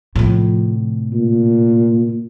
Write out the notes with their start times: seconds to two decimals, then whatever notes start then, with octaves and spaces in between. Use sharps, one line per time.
0.16 A2 C3 F3
1.13 A#2